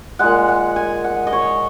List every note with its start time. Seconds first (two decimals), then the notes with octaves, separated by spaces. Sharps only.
0.19 A#2 G#3 F#5
0.48 F#5
0.76 G#5
1.04 F#5
1.27 D#5
1.33 C#5